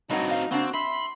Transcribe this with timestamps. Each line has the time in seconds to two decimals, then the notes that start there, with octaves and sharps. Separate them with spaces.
0.10 G2 F#3 C4 D#4 F#4
0.31 F5
0.51 C#3 A#3 C4 D4 F#4
0.74 E5 B5 C6